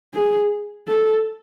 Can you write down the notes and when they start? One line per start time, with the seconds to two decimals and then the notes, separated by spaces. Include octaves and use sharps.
0.14 G#4
0.88 A4